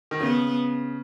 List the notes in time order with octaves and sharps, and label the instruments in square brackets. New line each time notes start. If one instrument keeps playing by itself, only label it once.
[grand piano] D#3
[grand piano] C#3 [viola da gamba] B3